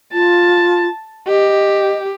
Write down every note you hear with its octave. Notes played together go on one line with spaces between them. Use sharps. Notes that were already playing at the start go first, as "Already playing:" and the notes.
F4 A5
G4 D#5